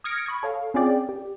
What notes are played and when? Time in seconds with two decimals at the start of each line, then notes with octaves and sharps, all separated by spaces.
0.04 D#6 F6 G#6 A#6 C#7 D7
0.26 B5 C#6 D#6 G#6
0.43 A4 C#5 F5
0.74 C4 C#4 F4 G#4 D5 G5
1.09 G4